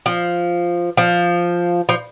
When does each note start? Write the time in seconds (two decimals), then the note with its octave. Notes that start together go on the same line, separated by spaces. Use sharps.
0.06 F3
0.97 F3
1.89 F3